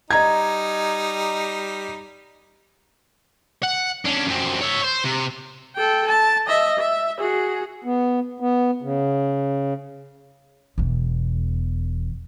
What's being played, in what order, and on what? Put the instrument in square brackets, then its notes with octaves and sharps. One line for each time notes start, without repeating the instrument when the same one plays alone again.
[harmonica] G3 D#4 [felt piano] D#5 A#5 G#6
[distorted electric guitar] F#5
C#4 D4
F#2 C4
C#5 E5
C5
C3
[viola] A4 G5
A5
D#5 E5
E5
F#4 G#4
[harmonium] B3
B3
C#3
[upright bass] E1 E2